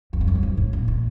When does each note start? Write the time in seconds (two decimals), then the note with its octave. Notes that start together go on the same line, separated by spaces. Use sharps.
0.13 E2
0.21 F2
0.27 F#2
0.35 G2
0.43 G#2
0.57 A2
0.73 A#2
0.88 A#2